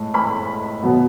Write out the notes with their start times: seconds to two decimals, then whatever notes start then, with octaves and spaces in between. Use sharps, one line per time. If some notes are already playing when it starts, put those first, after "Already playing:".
Already playing: A2 G#3 A5
0.14 B5
0.83 B2 F#3 B3